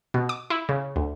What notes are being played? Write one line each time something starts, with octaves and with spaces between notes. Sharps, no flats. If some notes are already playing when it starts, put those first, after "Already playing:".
B2
D6
E4
C#3
D2